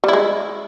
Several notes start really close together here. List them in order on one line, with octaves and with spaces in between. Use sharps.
G3 E4 G#3